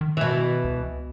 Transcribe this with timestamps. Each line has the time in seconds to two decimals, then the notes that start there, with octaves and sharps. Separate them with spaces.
0.01 D#3
0.17 B2 E3
0.64 C#2